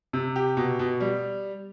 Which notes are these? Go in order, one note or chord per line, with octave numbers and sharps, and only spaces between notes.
C3
G4
B2
B2
G3